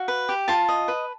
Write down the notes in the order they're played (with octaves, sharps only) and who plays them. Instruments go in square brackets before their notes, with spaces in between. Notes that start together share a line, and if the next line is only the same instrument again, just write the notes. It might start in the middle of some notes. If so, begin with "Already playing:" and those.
Already playing: [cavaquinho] F#4 F5
B4
G4
F4 A5
D#5
B4